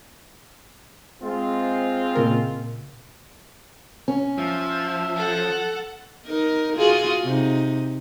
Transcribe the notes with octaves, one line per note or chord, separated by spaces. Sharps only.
G#3 C4 F4
A#2 C#3 A#4
C#4
F3 E5
A4 F#5
D#4 A#4
F4 F#4 G#4
C3 D#4